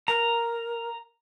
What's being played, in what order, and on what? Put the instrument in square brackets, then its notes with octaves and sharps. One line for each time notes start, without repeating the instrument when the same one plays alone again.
[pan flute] A#4 [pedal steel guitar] A#5